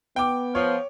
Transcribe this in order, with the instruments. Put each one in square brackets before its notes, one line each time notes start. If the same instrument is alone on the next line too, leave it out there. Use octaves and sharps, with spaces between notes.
[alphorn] B3 [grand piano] G5 D6
[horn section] F3 [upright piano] C#5